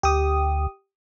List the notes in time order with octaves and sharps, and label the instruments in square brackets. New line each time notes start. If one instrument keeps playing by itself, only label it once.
[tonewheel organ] D2 [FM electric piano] G4 D#6